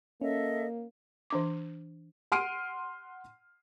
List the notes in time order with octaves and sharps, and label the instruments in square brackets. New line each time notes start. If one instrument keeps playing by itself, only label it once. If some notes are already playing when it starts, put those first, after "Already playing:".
[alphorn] A#3 [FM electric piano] C#4 [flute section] A4 D#5 E5
[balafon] E3 D4 D6
[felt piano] F#5 C6 F6 C7 D7 D#7